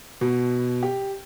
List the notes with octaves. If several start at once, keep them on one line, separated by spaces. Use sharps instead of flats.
B2
G4